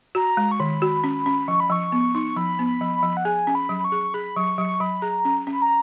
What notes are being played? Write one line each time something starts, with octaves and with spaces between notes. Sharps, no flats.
F#4 A#5
G#3
C#6
D#3 B5
F#4
C#4
C#4
F3 C#6
B5
F3 C#6
B3
D#4
F3 B5
B3
B5
F3
B5
F3
F#5
G#4 G#5
C#4
B5
F#3
B5
C#6
G#4
G#4 B5
F#3 C#6
F#3 C#6
F#3 B5
G#4 A#5
C#4
C#4
B5
A#5